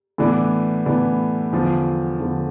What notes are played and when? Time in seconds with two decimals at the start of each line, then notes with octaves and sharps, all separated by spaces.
0.18 A2 E3 B3 D4
0.86 A2 E3 B3 D4
1.52 E2 D3 F3
2.19 E2 D3 F3